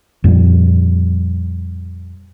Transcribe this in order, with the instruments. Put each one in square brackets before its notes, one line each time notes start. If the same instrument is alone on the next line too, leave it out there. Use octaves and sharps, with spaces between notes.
[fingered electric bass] F2 A#2 F3 G3